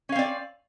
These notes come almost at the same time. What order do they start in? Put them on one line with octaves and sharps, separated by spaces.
C#4 F5 C4 D5